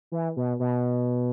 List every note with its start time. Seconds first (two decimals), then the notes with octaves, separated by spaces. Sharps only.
0.12 E3
0.37 B2
0.60 B2